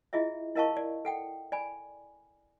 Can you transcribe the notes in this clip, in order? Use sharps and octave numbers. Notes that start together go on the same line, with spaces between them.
E4 F4 G#4 D#5 E5
E4 A#4 D#5 F5 A5 C#6
D5
A4 F#5 G5
D5 G#5 B5